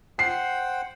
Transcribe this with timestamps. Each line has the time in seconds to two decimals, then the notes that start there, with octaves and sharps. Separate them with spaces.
0.19 C5 F#5 G5 C7